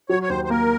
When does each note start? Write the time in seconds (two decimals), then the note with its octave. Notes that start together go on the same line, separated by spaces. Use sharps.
0.09 F#3 C#5
0.23 C#5
0.29 D#2 C5
0.44 C5
0.49 A#3 A#4